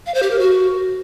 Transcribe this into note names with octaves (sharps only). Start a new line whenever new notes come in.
F5
C5
G4
A#4
F#4